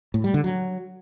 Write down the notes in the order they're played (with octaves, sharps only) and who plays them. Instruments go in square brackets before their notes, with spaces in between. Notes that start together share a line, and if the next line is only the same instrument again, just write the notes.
[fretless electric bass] A2
G3
D3
F#3